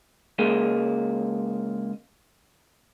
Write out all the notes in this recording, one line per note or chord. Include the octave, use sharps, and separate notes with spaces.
C#2 G#3 A#3